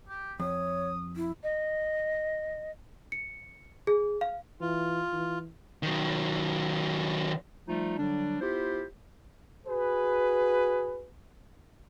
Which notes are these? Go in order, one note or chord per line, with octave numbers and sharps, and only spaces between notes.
G4
F2 C#5 D#6
E4
D#5
C#7
G#4
F5
E3 F4
E3
D#3 F#3
F3 G3 A3 D#4 F4
D3 F#3 G3 D4
B3 E4 F4 G4 C5
F#4 G#4 B4